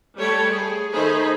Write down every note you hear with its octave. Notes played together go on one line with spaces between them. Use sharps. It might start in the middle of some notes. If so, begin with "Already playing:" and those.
G3 A3 C#5 G5 A5 B5
G#4
D#3 A3 D#4 G#4 C5 B5